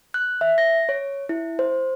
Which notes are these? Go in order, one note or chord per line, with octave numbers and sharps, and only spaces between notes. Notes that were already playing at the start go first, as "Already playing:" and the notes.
F#6
E5
A#6
C#5
E4
C5